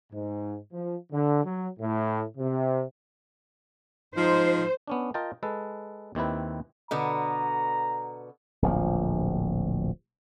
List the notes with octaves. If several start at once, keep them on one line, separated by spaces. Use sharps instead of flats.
G#2
F3
D3
F#3
A2
C3
F3 G#3 D#4 C5
B3 C#4 D4
F4 A#4 D#5 G5 A5
G#3 A4 B4
D#2 D#3 C4 E4 B4
B2 D3 B3 A#5
D1 A#1 F3